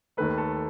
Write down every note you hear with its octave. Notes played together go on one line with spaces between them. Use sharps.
D#2 D#3 A3 B4
A4